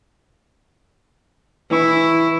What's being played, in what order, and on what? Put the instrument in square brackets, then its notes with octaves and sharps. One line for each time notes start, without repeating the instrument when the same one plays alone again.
[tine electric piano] E3 C#6 [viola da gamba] E4